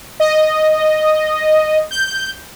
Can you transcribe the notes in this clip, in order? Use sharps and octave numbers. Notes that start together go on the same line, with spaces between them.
D#5
G6